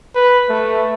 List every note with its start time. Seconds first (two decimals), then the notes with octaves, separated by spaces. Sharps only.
0.15 B4
0.50 A3